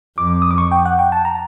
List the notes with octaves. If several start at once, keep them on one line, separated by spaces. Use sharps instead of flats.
F2 D6
D#6
D6
C#6
G5
F#5
G5
A5
A#5